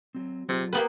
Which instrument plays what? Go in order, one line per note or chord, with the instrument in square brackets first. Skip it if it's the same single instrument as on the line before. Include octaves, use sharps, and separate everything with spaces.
[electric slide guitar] F#3 C4
[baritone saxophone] C3 [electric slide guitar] F#3 F4 G#4
[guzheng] A#3 B3 B4 [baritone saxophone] G4 [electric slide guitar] A4